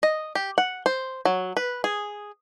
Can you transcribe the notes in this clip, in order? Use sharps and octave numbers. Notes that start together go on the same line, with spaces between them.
D#5
G4
F#5
C5
F#3
B4
G#4